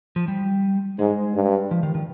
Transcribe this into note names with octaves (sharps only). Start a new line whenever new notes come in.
F3
G3
G#2 G#3
G2
F3
D#3
D#3